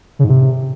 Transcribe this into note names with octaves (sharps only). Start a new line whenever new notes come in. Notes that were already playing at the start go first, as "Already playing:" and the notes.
C#3
G#2
C3